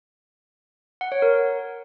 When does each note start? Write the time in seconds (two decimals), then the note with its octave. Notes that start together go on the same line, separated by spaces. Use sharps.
1.01 F#5
1.12 C#5
1.22 A#4